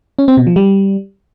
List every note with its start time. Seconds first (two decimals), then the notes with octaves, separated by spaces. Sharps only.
0.19 C#4
0.28 C4
0.37 B2
0.47 F3
0.56 G3